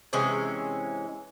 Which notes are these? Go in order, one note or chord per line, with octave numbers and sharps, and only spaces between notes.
C3 E3 G#3 C#4